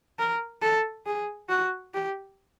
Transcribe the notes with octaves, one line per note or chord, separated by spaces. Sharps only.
A#4
A4
G#4
F#4
G4